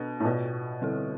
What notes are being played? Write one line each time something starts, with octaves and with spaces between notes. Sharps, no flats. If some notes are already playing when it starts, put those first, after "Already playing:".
Already playing: B2 D4 A4
A2
B2 B3 F4 B4 D5
D3 G3 C4 E4 A4